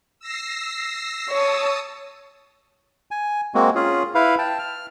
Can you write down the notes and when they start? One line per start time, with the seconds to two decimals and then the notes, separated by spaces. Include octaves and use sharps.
0.20 E6 A#6 C7
1.30 C#5 A5 D#6 E6
3.11 G#5
3.54 G#3 A#3 C4 F#4
3.75 C#4 F4 G#4
4.15 E4 B4 F5
4.39 G5 A5
4.59 F6